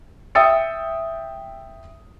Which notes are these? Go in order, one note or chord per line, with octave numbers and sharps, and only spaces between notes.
E5 G5 D#6 E6 A6 C#7